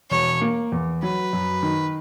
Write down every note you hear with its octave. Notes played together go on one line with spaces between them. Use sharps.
E1 C#5
A#3
E2
F#3 B4
F#2
D#3